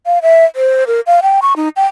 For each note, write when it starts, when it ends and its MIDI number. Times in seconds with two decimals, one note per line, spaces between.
0.06 0.19 77
0.22 0.45 76
0.56 0.84 72
0.87 1.00 70
1.07 1.20 77
1.22 1.40 79
1.42 1.54 85
1.56 1.69 63
1.76 1.86 79